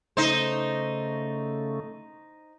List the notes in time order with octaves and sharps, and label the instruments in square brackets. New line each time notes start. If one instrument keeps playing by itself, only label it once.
[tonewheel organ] C#3 A3 [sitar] D#4 C5